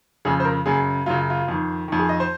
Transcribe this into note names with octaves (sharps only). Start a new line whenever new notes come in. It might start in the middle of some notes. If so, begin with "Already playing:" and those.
F2 C#3 G#4
C5
A#4
F#2 C#3 G#4
F#2 C#3 F4
F4
F2 D#3
F2 D#3
G#4
D#5
C5